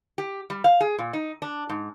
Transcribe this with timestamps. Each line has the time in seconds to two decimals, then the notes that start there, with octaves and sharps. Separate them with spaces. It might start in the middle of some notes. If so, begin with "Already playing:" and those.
0.18 G4
0.50 G3
0.64 F5
0.80 G#4
0.98 A#2
1.13 D#4
1.42 D4
1.69 G#2